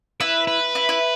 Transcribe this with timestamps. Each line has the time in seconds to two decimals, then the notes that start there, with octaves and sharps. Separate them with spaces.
0.21 E4 B4
0.47 B4
0.75 E4
0.89 E4